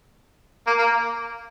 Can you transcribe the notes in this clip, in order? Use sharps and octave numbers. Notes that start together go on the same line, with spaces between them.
A#3
A#3